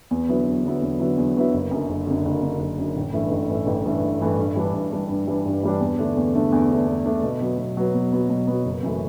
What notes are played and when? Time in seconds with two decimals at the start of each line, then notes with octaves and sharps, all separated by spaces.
0.11 E2
0.29 D3 F#3 B3 E4
0.47 E2
0.64 D3 F#3 B3 E4
0.82 E2
1.00 D3 F#3 B3 E4
1.18 E2
1.36 D3 F#3 B3 E4
1.54 F#1
1.71 F#2 D3
1.89 F#1
2.07 F#2 D3
2.25 F#1
2.43 F#2 D3
2.60 F#1
2.78 F#2 D3
2.96 A1
3.13 G2 E3 A3 E4
3.31 A1
3.49 G2 E3 A3 E4
3.67 A1
3.85 G2 E3 A3 E4
4.03 A1
4.21 G2 E3 A3 E4
4.38 G2
4.56 E3 G3 D4
4.74 G2
4.92 E3 G3 D4
5.09 G2
5.27 E3 G3 D4
5.46 G2
5.63 E3 G3 D4
5.81 E2
5.98 D3 A3 D4
6.17 E2
6.34 D3 A3 D4
6.53 E2
6.69 D3 A3 D4
6.88 E2
7.06 D3 A3 D4
7.23 B2
7.41 F#3 B3
7.58 B2
7.77 F#3 B3
7.95 B2
8.12 F#3 B3
8.30 B2
8.47 F#3 B3
8.65 F#1
8.83 F#2 E3 A3